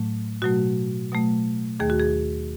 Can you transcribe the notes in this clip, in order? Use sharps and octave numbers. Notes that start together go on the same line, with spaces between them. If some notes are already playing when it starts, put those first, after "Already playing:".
Already playing: A2 F#3 A3
B2 F#3 A3 F#4
B2 F#3 A3
D#2 D#3 A3 G#4
F#4
G#4